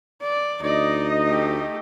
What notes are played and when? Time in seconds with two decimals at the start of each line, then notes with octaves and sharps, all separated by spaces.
0.21 D5
0.62 D2 D#4 D5 D#5
1.28 A3 G4